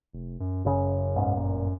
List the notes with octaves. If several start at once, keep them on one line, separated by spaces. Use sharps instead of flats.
F1
F#2
F#1 F#2 C#3
B1 G#2
G1 A#2